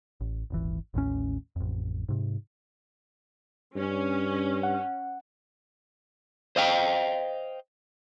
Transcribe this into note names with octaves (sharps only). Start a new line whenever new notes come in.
A1
D#1 G#1 E3
A1 D#2 A2 C#4
A1 F2
G#2 C3
G2 C#4
F#5
C5 D#5 F5 G5